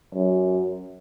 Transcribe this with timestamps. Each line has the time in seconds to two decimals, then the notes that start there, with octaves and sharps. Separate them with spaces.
0.15 F#2